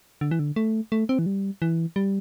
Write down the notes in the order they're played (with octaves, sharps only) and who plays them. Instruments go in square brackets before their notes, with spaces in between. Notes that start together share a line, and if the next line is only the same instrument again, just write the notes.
[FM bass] D3
E3
D3
A3
A3
C4
E3
G3
E3
G3